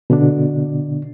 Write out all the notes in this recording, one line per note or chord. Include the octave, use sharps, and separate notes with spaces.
B2 D3 D4